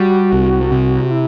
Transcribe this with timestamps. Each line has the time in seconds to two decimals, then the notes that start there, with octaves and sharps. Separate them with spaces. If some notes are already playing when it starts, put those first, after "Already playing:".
Already playing: G3 F#4
0.33 C2
0.72 C3
1.11 E4